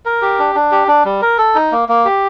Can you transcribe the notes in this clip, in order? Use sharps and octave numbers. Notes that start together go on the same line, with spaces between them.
A#4
G4
D4
D4
G4
D4
G3
A#4
A4
D#4
A#3
A#3
G4